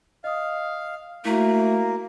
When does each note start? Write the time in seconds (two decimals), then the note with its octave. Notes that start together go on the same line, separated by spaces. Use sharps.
0.24 D#5 F5 D#6
1.25 A3 A#3 E4 F#4